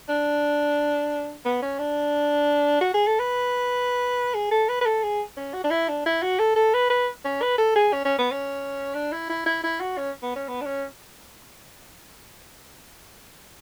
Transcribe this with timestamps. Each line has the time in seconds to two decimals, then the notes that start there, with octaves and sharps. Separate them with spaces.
0.09 D4
1.45 B3
1.63 C#4
1.79 D4
2.81 F#4
2.94 G#4
3.07 A4
3.20 B4
4.35 G#4
4.51 A4
4.69 B4
4.81 B4
4.86 A4
5.03 G#4
5.37 C#4
5.54 F#4
5.64 D4
5.71 E4
5.88 D4
6.06 E4
6.22 F#4
6.39 A4
6.56 A4
6.74 B4
6.90 B4
7.25 C#4
7.42 B4
7.58 A4
7.76 G#4
7.93 C#4
8.05 C#4
8.18 B3
8.32 C#4
8.95 D4
9.12 E4
9.29 E4
9.46 E4
9.64 E4
9.80 F#4
9.97 C#4
10.23 B3
10.36 C#4
10.48 B3
10.61 D4
10.66 C#4